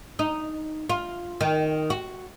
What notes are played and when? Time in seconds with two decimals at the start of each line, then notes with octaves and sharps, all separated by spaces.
0.19 D#4
0.89 F4
1.41 D#3
1.90 F#4